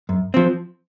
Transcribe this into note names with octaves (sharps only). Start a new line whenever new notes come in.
F#2
F3 C4